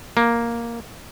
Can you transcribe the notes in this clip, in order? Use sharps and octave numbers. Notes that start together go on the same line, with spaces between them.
A#3